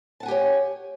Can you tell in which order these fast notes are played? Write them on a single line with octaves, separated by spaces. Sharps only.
A5 F#5 G#5 G4 C#5